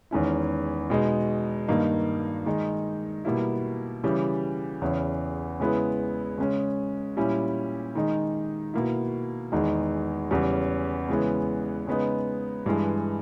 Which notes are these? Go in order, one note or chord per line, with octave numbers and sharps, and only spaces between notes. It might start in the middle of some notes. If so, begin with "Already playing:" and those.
E2 D#3 G#3 C#4 E4
B2 G#3 D#4
G2 D#3 A#3 D#4
D#3 G#3 D#4
B2 G3 A#3 E4
C#3 E3 G3
E2 C#3 E3
C#3 G#3 B3 E4
C#3 G#3 C#4
A#2 G3 C#4 E4
D#3 G#3 D#4
B2 A#3 E4
E2 D#3 G#3 D#4
E2 C#3 G3 C#4
C#3 E3 G#3 B3
C#3 G#3 B3 D#4
G2 E3 G#3